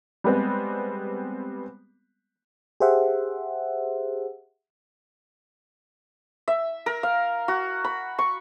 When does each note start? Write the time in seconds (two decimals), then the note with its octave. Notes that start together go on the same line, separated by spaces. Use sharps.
0.24 G3 G#3 B3 C4
2.80 G4 G#4 C5 E5 F#5
6.48 E5
6.86 A#4
7.03 F5
7.48 F#4
7.84 B5
8.19 C#6